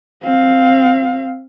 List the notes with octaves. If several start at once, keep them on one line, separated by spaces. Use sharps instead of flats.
C4 F5